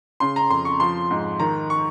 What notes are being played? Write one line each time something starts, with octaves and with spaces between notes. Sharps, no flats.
C#3 C6
A#5
F2 C6
C#6
F3 C6
G#2
D#3 A#5
C#6